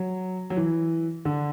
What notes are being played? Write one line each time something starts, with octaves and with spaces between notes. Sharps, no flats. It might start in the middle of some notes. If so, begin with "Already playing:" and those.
Already playing: F#3
F#3
E3
D3